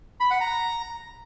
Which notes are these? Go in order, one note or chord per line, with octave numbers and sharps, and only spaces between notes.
B5
F#5
A#5